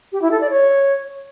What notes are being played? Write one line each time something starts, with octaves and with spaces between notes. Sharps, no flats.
G4
E4
A4
D5
C#5